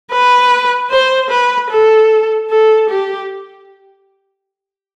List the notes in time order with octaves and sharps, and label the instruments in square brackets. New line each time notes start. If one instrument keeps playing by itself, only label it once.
[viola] B4
C5
B4
A4
A4
G4